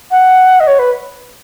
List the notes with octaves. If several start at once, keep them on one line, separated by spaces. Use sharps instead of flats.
F#5
D#5
C#5
B4